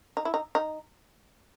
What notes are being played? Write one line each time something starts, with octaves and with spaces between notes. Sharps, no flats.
D#4
E4
D#4
D#4